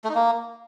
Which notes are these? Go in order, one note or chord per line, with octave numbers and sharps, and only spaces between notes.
A3
D#4
A#3